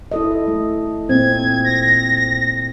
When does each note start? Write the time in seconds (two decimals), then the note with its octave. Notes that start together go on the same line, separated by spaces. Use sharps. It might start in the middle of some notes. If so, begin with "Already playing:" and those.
0.12 E4 A4 D#5
0.48 A3
1.09 A#2 C4 G#6
1.65 A#6